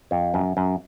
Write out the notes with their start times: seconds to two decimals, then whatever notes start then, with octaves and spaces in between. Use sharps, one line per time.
0.11 F2
0.34 F#2
0.57 F#2